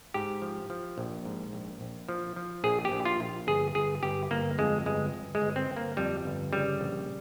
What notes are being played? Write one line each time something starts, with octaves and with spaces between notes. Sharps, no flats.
G#2 G4
F3
F3
A#1
G#2
A#1
A#1
F3
F3
A#1 G#4
G4
A#1
F4
A#1
G1 G#4
G1 G#4
G1 G4
G1 A#3
F2 G#3
G1 G#3
G1
G#3
G1
C4
G1
A#3
F2 G3
G1
C#3 G3
A#1